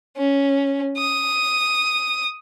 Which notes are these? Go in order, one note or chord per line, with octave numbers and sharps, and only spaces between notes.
C#4
D#6